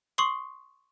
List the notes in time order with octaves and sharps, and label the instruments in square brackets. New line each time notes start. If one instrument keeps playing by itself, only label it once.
[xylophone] C6 C#6 D#6 C7 F#7 G7